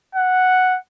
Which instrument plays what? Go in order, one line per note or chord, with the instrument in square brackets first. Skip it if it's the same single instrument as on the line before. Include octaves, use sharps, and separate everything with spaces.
[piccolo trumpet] F#5